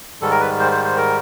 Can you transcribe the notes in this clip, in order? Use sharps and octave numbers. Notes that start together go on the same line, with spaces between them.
G#2 D#3 G3 A4
A#4
B4
C5
C5
C5
A#4